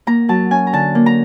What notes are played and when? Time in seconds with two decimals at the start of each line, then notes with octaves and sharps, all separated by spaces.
0.07 A#3 A#5
0.29 F#3 A5
0.51 C#4 G#5
0.67 A#5
0.73 D3 A5
0.95 A#3
1.06 A#5